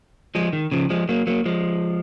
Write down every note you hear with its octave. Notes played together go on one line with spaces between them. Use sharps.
F3 G#3
D#3
C#3 F3
F3 G#3
F#3 A#3
F#3 A#3
F3 G#3